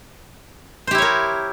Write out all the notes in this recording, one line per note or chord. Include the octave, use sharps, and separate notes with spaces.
E4 G4 A#4 C5 C#5